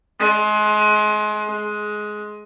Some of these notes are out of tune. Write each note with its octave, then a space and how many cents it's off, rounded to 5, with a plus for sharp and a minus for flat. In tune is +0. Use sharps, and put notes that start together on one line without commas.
G#3 +30
G#3 +15